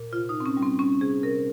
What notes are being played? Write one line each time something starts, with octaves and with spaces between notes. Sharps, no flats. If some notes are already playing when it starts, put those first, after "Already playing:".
Already playing: A#2
C3 F4
D#4
C3
C4
C#4
G3
C4
G3 C#4
C3 G#4
C3 A#4